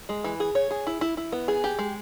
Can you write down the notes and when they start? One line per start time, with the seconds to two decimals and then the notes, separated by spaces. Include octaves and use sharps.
0.09 G#3
0.24 E3
0.40 G#4
0.55 C#5
0.71 G#4
0.87 E4
1.01 E4
1.17 E4
1.32 B3
1.48 G#4
1.64 G4
1.79 G#3